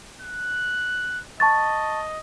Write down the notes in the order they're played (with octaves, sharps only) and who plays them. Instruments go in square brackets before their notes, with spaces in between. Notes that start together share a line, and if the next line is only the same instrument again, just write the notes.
[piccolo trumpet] F#6
[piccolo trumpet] D#5 [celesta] A5 C#6 A6